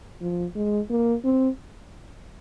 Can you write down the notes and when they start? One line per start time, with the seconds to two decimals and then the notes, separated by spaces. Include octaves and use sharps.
0.21 F3
0.56 G#3
0.90 A#3
1.24 C4